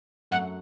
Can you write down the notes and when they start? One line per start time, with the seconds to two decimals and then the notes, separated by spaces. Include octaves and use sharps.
0.31 F#2 F#3 A3 F#5